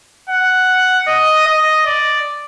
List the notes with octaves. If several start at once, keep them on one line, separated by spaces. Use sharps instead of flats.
F#5
D#5
D#5
D5